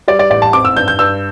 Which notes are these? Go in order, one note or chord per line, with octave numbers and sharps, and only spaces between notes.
G3 D5
D5
A1 D5
A5
C4 D6
E6
G2 G6
G6
G2 E6